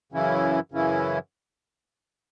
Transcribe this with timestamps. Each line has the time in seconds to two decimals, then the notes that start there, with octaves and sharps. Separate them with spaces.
0.12 F#2 C#3 E3 C#4 E4
0.72 F#2 C#3 E3 C#4 E4